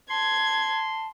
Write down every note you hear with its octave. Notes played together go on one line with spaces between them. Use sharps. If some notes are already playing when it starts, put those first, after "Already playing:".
A5 C6 G#6